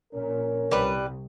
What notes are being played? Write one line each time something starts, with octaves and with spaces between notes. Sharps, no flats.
A#1 A#2 C#4 A#4
C2 G3 B4